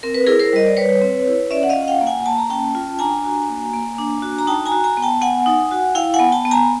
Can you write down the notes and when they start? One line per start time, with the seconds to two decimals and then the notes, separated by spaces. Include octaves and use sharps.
0.03 C4 A#4
0.14 B4
0.26 E4 G#4 A#4
0.40 A#4 C5
0.53 G3 D#5
0.67 D5
0.77 G3 B4 C#5
1.02 C4
1.27 E4
1.51 C#4 D5 E5
1.63 F#5
1.69 D#5 F5
1.75 F4
1.82 F#5
1.88 F5 G5
2.01 A#3
2.07 F#5 G#5
2.26 A#3 A5
2.38 A#5
2.49 C#4 G5 A5
2.75 F4
2.99 D4 G#5 A#5
3.24 F#4
3.49 A#3
3.74 A#3
3.98 D4
4.22 F#4
4.39 A#5
4.47 D#4 G5 A5
4.66 G#5 A#5
4.72 F#4
4.84 G#5 A#5
4.97 B3
5.02 G5 A5
5.21 B3 F#5 G#5
5.46 D#4
5.71 F#4
5.95 E4 F5 G5
6.14 F#5 G#5
6.20 B3
6.32 G5 A5
6.45 B3
6.51 G#5 A#5